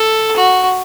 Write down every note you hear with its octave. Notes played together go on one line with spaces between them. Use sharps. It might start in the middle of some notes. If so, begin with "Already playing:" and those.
Already playing: A4
F#4